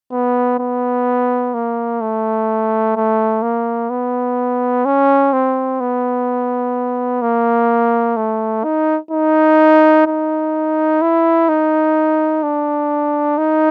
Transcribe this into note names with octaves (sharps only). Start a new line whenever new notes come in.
B3
B3
A#3
A3
A3
A#3
B3
C#4
C4
B3
A#3
A3
D#4
D#4
D#4
E4
D#4
D4
D#4